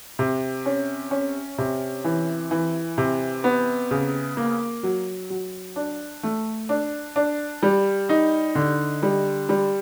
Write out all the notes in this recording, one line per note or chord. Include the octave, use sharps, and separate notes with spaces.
C3
C#4
C#4
C3
E3
E3
C3
B3
C#3
A#3
F#3
F#3
D4
A3
D4
D4
G3
D#4
D3
G3
G3